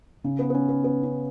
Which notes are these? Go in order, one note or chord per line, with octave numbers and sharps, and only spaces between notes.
C#3
B3
B3
C#4
B3
B3
C#4